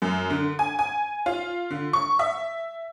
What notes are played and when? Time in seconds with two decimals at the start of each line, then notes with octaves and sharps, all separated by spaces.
0.02 F#2
0.30 D3
0.59 G#5
0.79 G#5
1.26 F4
1.70 D3
1.93 C#6
2.19 E5